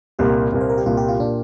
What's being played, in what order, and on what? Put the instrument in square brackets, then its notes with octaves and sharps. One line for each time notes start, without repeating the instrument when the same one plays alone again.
[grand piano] C2 A#2 A#3 [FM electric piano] G4
[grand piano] C2 A#2 A#3
[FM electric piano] C5
A#4
G4
[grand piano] C2 A#2 A#3 [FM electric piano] F4
[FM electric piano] G4
F4
[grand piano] A#2 A#3 [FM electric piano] D4